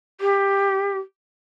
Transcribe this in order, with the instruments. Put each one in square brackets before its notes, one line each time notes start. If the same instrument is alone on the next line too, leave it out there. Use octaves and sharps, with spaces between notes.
[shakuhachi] G4